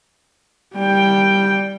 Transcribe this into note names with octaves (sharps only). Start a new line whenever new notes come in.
G3 G5